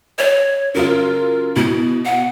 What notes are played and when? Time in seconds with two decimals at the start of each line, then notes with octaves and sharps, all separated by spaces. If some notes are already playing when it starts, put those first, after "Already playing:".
0.19 C#5
0.74 C#3 F#3 F4 A#4
1.56 B2 E4
2.05 F#5